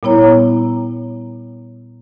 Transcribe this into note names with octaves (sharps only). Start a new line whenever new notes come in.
A#2 G3 B3 E4 C#5 A#5